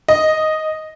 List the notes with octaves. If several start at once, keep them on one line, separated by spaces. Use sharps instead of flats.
D#5